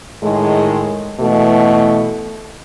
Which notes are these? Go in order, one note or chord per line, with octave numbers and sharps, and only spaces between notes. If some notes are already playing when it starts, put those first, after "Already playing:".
A2 D#3 G#3
B2 E3 A3